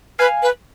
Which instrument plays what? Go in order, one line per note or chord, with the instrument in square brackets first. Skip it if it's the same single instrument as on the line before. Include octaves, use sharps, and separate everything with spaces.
[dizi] B4 [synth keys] F5 G#5
[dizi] B4